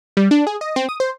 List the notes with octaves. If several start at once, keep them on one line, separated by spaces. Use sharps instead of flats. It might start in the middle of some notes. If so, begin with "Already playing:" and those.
G3
D4
G#4
D#5
C4
D#6
C5